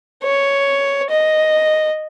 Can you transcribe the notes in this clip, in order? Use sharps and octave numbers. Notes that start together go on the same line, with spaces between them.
C#5
D#5